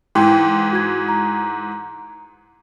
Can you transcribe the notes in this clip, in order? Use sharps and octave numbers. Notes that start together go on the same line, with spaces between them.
G#2 E3 G5 C6
F#4 G#6
A#5